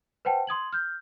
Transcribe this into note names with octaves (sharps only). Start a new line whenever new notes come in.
B4 C5 F#5 G5 A5
C6 D#6 G#6 F#7
F6 G6